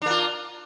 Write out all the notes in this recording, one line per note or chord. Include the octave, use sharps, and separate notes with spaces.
A#3 D4 F4